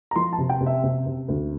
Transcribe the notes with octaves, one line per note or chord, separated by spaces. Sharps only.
A#5
F3 C6
A5
C3
G5
C3
E5
C3
C3
D2